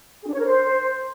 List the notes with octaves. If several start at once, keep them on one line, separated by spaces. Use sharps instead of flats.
G#4
D4
C#5
A#4
C5